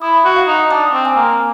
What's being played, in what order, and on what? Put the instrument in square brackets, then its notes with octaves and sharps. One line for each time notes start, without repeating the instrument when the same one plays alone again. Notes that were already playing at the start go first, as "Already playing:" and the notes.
[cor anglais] E4 [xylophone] D#6
[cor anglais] F#4
[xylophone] F5
[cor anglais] D#4
[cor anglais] D4 [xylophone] D#6
[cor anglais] C4
[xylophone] G#5
[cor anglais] A#3